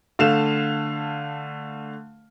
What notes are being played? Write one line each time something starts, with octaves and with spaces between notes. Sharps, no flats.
D3 A3 F5 F6 E7